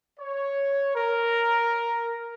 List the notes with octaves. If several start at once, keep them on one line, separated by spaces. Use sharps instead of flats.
C#5
A#4